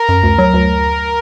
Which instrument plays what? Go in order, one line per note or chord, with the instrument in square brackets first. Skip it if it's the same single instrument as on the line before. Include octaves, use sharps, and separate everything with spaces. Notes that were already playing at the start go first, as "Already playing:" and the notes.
Already playing: [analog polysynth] A#4
[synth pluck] F#2
D2
F#3
D2